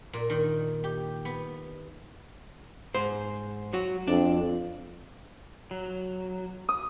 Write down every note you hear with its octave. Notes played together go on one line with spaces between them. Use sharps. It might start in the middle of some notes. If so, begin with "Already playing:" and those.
A#2
D#3
G4
B3
G#2 C5
F#3 F#4
F2 D4
F#3
D#6